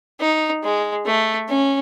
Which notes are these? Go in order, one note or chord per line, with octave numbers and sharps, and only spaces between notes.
D#4
G#3
A3
C#4